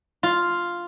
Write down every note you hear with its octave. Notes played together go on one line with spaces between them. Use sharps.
F4